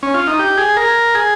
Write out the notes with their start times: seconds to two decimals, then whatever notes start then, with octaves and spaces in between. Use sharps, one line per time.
0.03 C#4
0.14 F4
0.27 D#4
0.39 G4
0.58 G#4
0.77 A#4
1.15 G#4